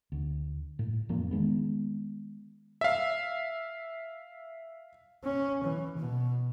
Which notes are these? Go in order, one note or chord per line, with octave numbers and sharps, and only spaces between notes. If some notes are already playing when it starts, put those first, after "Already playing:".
D2
A2
F1 F3 A#3 C#4
D#3 G#3 B3
E5 F5
C#4
E3
B2